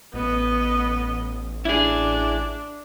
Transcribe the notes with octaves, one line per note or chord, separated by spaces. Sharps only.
A1 B3 D#5
D4 E4 G#4